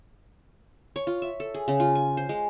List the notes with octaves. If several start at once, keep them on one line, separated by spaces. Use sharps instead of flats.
C#5
F4
E5
A4
G#4
C#3
F4
G#5
C5
G#3